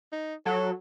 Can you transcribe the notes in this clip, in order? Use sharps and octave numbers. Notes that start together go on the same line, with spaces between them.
D#4
F#3 A4